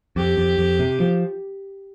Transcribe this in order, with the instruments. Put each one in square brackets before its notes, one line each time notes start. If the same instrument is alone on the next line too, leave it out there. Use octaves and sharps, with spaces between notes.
[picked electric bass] F2 [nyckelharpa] G4
[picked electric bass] F2
F2
C3
F3